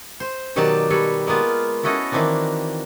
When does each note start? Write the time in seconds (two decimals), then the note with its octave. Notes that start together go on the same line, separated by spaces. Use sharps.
0.20 C5
0.56 B2 D#3 F#3 G4 D5 A5
0.90 G3 A4 B4 C#5
1.27 G#3 A#3 B3 F4
1.83 C#4 E4 F#4 A4 D#5
2.12 D#3 E3 A#3 C4 D4